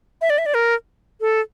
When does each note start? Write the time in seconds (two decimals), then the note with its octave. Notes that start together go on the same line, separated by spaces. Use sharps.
0.21 E5
0.30 D5
0.38 E5
0.46 D5
0.54 A#4
1.21 A4